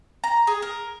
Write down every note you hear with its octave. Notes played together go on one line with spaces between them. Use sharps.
A#5
G#4
A#4